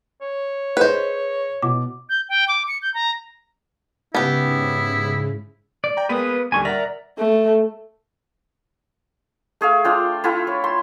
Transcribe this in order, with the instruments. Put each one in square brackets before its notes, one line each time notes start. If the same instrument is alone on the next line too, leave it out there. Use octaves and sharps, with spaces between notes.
[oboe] C#5
[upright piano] G#4 D#5 [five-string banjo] B4 C5
[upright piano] B2 [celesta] D6
[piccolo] G6
G5
D6
C#7
G6
A#5
[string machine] G#2 C#3 [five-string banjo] B3 G4 [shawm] E4
[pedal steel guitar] D5
[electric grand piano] G5 A#5
[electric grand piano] G#3 A#3 B3 [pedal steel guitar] B4 D#6
[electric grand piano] D#2 D3 G3 [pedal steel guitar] G#5 C#6
[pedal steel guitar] A#4 D5 E5 [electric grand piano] F#5 A#5 A#6
[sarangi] A3
[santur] A3 G#4 E5 F5
D4 F4 G5
E4 F4 A4 G5
C#5
C6